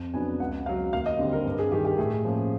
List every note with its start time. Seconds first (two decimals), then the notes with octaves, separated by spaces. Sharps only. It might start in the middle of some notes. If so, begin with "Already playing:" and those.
Already playing: F2
0.14 C#3 F#3 B3 D4 G#5
0.40 C#2 F#5
0.66 C#3 F#3 F5
0.93 D#2 F5
1.06 D#5
1.19 D3 G3 C4
1.33 A#4
1.45 G2
1.59 G#4
1.72 D#3 G3 G4
1.85 G4
1.98 A2 G#4
2.25 F3 A#3 C#4